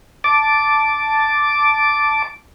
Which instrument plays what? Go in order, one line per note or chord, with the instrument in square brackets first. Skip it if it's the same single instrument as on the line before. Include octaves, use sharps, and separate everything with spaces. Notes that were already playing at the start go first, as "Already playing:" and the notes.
[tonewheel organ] A5 D6